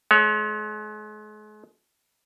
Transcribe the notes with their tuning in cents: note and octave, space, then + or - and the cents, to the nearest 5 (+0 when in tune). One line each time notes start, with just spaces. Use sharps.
G#3 +40 C#5 +0